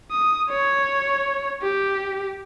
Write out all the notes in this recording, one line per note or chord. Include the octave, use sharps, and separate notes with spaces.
D#6
C#5
G4